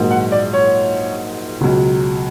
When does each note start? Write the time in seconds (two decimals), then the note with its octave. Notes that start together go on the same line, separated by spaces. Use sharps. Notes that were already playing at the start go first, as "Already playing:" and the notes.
Already playing: A#1 G#2 D#3 F#3
0.11 F#5
0.32 D5
0.53 C#5
1.61 C#2 B2 F#3